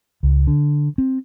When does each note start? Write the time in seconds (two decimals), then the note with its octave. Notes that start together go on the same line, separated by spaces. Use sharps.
0.23 C#2
0.47 D3
0.98 C4